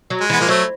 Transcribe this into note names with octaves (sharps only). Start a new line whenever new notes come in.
F#3
G#3
E3 B3
F3 A#3
F#3 A3